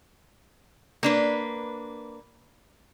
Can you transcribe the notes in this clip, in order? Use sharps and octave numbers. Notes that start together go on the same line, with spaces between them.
A#3 D4 B4